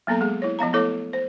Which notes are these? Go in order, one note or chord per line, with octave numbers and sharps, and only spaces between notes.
F#3 A#3 B3 A4 A#5
G#3 G#4
E4 C#5
F3 B3 F5 A#5
A3 B3 E4 A4 C#5 D6
C5